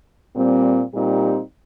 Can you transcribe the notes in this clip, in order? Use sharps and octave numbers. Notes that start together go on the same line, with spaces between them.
A#2 G3 C4
A#2 G3 C4 D#4 G4